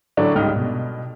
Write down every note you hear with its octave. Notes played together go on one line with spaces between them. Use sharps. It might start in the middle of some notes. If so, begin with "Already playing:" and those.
A2 D3 F#3 A3 D4
C#2 G#2 G3 D#5 F6
B2